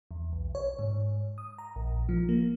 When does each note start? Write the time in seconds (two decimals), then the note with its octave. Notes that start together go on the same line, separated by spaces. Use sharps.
0.11 E2
0.33 B1
0.55 C#5
0.79 G#2
1.38 D#6
1.58 A#5
1.76 A#1
2.09 F3
2.29 A#3